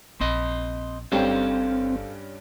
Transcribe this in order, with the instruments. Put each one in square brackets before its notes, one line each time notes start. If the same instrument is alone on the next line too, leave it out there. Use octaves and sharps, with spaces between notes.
[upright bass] A#1 [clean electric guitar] C4 D#5
[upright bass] G1 [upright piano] G2 G3 C#4 [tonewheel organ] C4 [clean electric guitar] A4 C5 F5